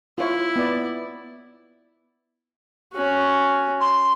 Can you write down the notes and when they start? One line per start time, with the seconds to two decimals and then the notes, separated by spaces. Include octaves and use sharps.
0.18 E4 F4 C#5
0.56 B3 D5
2.94 C#4 F#4
3.80 C6